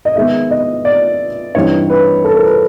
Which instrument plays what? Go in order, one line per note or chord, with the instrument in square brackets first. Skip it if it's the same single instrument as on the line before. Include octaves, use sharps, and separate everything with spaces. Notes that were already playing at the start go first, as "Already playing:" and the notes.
[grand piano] D#5
D#3 G#3 B3 E5
D#5
D5
G2 E3 G3 C4 D#4 C#5
B4
A4
A#4
B4